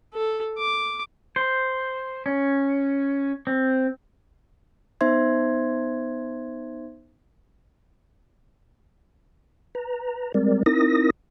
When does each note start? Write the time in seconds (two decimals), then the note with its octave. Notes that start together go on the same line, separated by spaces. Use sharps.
0.14 A4
0.59 D6
1.36 C5
2.26 C#4
3.47 C4
5.01 B3 D#4 C5 E5 C6 G#6
9.75 B4 A#5
10.34 G3 G#3 C4 A#4 D5
10.66 C4 D#4 E4 A#4 D#6 A#6